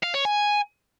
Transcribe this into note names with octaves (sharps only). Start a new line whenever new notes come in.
F5
C#5
G#5